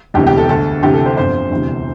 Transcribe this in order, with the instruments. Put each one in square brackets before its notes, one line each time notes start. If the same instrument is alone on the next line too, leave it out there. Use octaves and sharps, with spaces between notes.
[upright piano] E1 D2 C3 E3 G4
G4
A4
D2 D3 A4
D2 C3 E3 G4
A4
C5
G1 F2 D3 C5
E1 D2 C3 E3